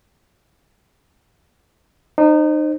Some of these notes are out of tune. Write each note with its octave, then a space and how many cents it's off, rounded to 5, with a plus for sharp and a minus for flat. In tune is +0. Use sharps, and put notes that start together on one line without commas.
D#4 -30 C5 +15